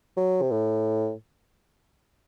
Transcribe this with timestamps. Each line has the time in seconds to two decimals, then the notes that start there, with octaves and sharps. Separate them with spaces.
0.17 F#3
0.42 C3
0.51 A2